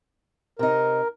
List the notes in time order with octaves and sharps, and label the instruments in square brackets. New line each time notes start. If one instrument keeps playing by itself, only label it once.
[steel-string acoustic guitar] C3 D#4 [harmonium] A#4